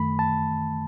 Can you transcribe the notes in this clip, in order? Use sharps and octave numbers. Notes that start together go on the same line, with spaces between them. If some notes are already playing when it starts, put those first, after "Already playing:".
Already playing: F#2 D#3 A3 B5
A5